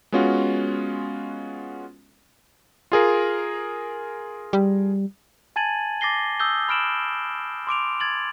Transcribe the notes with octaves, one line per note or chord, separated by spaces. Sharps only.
G#3 B3 C#4 F4 F#4
F4 G#4 A#4
G3
G#5 A5 G#6 A6 D#7 F#7
D6 A6 A#6 C7 G7
D#6 E6 G6 G7
B5 F6 D7 E7 F#7
C6 D6 D7 F7
G#6 A6 F#7